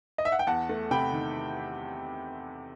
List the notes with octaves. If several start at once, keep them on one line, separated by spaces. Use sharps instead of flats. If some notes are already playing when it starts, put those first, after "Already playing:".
D#5
E5
F#5
G5
E2 F#5 A5
A3
C3 G5 B5
D#3